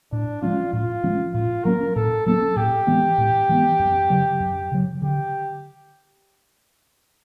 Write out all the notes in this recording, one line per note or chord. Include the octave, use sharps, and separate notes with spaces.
A2 D4
F3 G#3 C#4 F4
A2 F4
F3 G#3 C#4
A2 F4
F#3 A#3 C#4 A#4
A2 A4
F#3 A#3 C#4 A4
A2 G4
E3 G#3 B3
A2
E3 G#3 B3
F#2
C#3 F#3
F#2
C#3 F#3
D3 G4